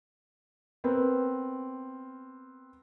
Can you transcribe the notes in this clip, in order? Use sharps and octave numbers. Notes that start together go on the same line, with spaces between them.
B3 C4 A#4